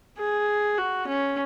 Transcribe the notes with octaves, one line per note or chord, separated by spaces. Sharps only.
G#4
F#4
C#4